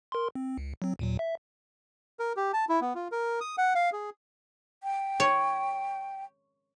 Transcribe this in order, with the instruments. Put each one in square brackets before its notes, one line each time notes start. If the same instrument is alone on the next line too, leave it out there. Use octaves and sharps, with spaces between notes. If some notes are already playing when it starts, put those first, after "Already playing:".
[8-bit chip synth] A#4 C6
C4
C#2
F#3 C4
D#2 A#2 F#3
E5
[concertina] A#4
G4
A5
E4
B3
F4
A#4
D#6
F#5
F5
G#4
[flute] G5
[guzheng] C#5